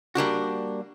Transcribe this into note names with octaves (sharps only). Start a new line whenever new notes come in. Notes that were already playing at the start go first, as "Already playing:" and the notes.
G3 A#3 D4 F#4